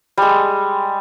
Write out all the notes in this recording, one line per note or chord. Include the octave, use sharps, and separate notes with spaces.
G3 G#3